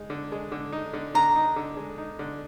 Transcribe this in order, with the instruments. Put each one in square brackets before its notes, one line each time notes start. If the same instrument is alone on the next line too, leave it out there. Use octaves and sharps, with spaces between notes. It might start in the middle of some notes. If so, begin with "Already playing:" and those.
Already playing: [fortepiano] G#3 D#4
D3
G#3
D3
D#4
D3
[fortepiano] D3 [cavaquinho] A#5
[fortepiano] D#4
D3
G#3
D#4
D3